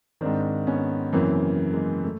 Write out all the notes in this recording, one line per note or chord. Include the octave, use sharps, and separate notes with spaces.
G#2 D#3 C4 D4
B3 C#4
F#2 C#3 E3 A#3 C4
G#3 A#3
A3